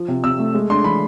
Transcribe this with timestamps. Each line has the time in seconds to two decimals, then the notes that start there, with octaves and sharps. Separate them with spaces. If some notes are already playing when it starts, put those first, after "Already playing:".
Already playing: F3
0.08 C3
0.24 C3 E6
0.39 A3
0.55 G#3
0.70 D4 C6
0.84 E3 B5